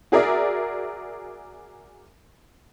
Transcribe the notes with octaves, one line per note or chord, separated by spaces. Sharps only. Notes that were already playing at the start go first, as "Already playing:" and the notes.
F#4 G#4 A#4 D5 E5